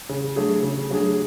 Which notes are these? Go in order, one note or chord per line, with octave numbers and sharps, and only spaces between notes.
C#3
F#3 A3 D4 G#4
C#3
F#3 A3 D4 G#4